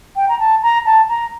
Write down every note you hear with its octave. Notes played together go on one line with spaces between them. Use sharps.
G5
A#5
A5
A#5
A5
A#5